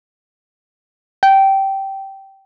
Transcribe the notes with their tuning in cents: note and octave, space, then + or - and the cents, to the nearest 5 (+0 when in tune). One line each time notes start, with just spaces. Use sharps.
G5 -15